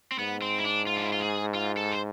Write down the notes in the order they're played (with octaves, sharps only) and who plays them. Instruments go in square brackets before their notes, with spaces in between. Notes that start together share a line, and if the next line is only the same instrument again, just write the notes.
[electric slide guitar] C4
[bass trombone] G#2 [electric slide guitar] B3
[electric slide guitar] C4
E4
D4
F4
D4
E4
F4
G#4
F4
A4
C5